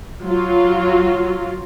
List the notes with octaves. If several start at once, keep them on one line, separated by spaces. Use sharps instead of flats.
F#3 F4